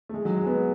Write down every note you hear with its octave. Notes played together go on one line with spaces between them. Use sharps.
A3
G#3
F#3
G#3
B3